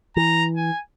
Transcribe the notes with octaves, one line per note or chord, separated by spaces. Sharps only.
E3 A#5
G#5